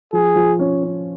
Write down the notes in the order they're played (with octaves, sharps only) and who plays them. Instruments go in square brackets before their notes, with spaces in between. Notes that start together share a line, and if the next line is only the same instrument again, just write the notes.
[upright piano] F3 [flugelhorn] G#4
[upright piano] F3
C#4
C#4